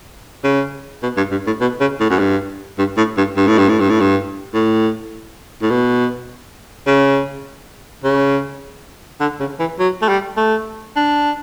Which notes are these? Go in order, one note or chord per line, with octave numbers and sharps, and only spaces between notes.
C#3
B2
G2
G2
A2
B2
C#3
A2
F#2
G2
G2
A2
G2
G2
A2
G2
A2
G2
A2
G2
A2
A2
B2
C#3
C#3
D3
C#3
E3
F#3
A3
G3
A3
D4